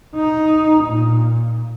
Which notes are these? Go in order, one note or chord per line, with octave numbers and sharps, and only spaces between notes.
D#4
A#2